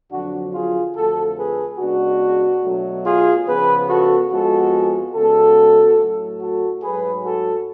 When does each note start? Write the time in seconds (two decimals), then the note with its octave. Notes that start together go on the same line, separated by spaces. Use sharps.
0.11 F2 D3 F#3 D4 F#4
0.53 F4 G#4
0.95 F2 D3 F3 A3 F#4 A4
1.36 G#4 B4
1.79 C#3 G#3 B3 D4 F#4
2.63 B2 F#3 A3
3.05 F4 G#4
3.46 C#3 F3 B3 G#4 B4
3.88 F#4 A4
4.30 F2 F3 G#3 B3 F#4 A4
5.14 C#3 G#3 B3 F#4 A4
5.99 A2 F#3 A3
6.40 F#4 A4
6.83 G#2 F#3 A3 G#4 B4
7.24 F#4 A4